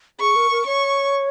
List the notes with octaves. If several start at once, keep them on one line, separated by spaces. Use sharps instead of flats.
G#4 C#6
A#4
A#4
C#5 C#6